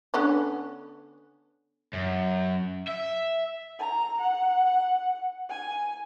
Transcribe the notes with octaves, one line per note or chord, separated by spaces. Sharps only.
D3 B3 C#4
F#2
E5
A#5
F#5
G#5